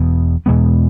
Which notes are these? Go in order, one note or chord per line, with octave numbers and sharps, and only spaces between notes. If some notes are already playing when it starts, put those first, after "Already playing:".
Already playing: E1 E2 B2
E2 B2 G#3 B3